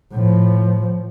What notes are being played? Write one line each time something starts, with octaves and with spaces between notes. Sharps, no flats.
A2 F3